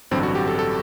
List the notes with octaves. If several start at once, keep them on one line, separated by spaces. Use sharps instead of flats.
A1 G2 D3 F#3 C4
F#4
G4
A4
A4